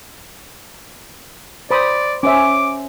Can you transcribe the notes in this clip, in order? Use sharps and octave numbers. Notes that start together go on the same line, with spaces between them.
C5 D5 B5 D#6
C#4 C5 E5 D6